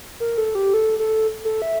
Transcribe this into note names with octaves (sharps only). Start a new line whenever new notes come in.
A#4
A4
G4
A4
A4
A4
E5